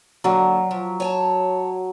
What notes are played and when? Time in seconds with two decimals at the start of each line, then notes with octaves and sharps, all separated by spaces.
0.24 D3 F#3 A#3
0.71 F3
1.00 C#5 G#5 A5